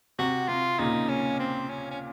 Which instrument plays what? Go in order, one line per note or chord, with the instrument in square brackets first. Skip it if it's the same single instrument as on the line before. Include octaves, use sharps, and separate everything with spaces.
[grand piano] C3 [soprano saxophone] F#4
[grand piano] C3 [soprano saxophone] F4
[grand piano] A#2 C#3 [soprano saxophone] D#4
[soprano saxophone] C#4
C4
C#4
C#4